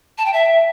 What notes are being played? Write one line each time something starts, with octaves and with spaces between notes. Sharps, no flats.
A5
G5
E5